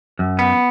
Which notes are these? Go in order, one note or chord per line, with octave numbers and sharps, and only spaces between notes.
F#2
B3